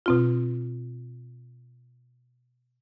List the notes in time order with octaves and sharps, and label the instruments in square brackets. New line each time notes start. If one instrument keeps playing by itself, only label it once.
[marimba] B2 C4 F4